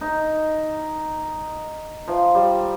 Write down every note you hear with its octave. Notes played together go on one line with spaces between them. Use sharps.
D#4
F3
G3